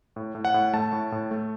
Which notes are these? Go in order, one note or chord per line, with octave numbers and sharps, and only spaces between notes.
A2
A2
F#5
A2
A3 A5
A2
A2
A3